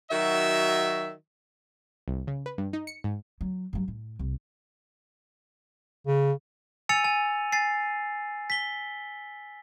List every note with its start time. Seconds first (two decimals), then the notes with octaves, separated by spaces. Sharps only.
0.11 D#3 F#3 F#4 E5
2.08 C2
2.27 C#3
2.46 B4
2.58 G2
2.73 D#4
2.87 C#7
3.04 G#2
3.41 F#3
3.73 G2 F#3
3.88 A2
4.19 C2
6.07 C#3
6.89 G#5 E6 A6 C#7 D#7 F7
7.04 G#5
7.52 G#5 A6 C7
8.50 B6 G7